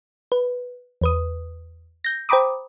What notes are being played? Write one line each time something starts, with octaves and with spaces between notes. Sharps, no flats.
B4
E2 B4 D#6
G6 A#6
C5 G5 A#5 B5 D6 D#6